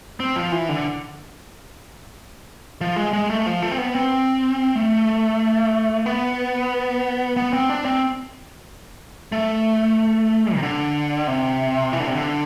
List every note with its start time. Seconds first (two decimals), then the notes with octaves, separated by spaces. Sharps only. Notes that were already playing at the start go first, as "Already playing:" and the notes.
0.20 C4
0.36 F3
0.52 E3
0.69 D3
2.81 F3
2.96 G#3
3.13 G#3
3.30 A3
3.46 F3
3.62 A3
3.72 C4
3.78 B3
3.95 C4
4.75 A3
6.06 B3
7.37 B3
7.53 C4
7.69 D4
7.85 C4
9.32 A3
10.55 C3
10.63 D3
11.28 C3
11.93 E3
12.00 D3
12.07 C3
12.15 D3